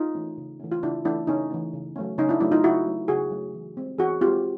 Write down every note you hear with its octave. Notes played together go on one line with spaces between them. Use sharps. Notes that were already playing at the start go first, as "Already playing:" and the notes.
Already playing: D#4 F4
E3 A3 C#4
C#3
E3 A3 C#4
F4
C#3 D4 E4
E3 A3 C#4 D4 E4
C#3 C#4 D#4
E3 A3 C#4
C#3
F#3 A3 C#4
C#3 C#4 D#4
D4 E4
F#3 A3 C#4 D4 E4
D#4 F4
C#3 E4 F#4
F#3 A3 C#4
C#3 F#4 G#4
F#3 A3 C#4
E3
G#3 C4
E3 F#4 G#4
G#3 C4 F4 G4